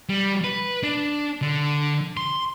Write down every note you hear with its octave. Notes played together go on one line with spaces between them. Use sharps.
G3
B4
D4
D3
C6